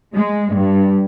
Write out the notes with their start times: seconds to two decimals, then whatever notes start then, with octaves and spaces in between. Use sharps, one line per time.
0.14 G#3
0.54 G2